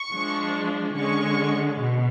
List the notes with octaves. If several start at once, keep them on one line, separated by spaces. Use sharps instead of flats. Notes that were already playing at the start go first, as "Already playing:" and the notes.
Already playing: C#6
F3 G#3 D4
D3 G#3 C#4 C#6
B2